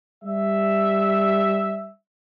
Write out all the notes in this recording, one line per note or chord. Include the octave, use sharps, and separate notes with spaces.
G3 E5